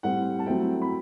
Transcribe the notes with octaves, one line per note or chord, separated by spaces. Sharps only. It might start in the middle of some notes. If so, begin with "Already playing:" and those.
A2 G3 C4 F#5
A5
F#3 A3 C4 E4 G5
B5